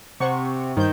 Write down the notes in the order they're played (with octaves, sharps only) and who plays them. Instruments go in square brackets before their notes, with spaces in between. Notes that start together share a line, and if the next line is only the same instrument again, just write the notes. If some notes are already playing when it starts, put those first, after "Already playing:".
[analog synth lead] C3 [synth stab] C5 F#5 C#6
[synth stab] G2 C5 G6 [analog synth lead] D#3